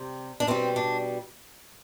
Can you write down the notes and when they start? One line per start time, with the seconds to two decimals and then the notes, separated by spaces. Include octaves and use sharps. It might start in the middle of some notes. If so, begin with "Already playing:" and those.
Already playing: C3 G3
0.40 D4
0.47 B2 G3 C4
0.76 D4